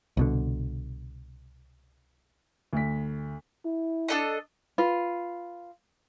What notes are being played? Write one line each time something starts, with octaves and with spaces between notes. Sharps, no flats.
C2 B2 D3
D2 B6
E4
D4 A4 D#5
F4 B4